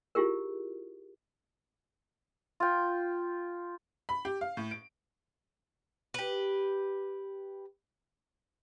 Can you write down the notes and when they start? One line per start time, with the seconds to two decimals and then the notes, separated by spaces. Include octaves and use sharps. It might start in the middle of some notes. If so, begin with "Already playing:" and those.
0.15 E4 F4 G4 G#4 A#4
2.60 F4 G5
4.09 B5
4.25 G4
4.41 F5
4.57 A2
4.71 D7
6.14 G4 B4